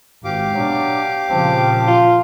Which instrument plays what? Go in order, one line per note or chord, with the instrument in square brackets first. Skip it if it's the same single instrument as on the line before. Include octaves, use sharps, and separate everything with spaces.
[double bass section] G#1 [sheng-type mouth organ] G4 F5 D6
[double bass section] B2 [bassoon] F#3 [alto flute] D4
[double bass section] A#2 C#3 F3 [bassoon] C4 [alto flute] A5
[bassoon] F4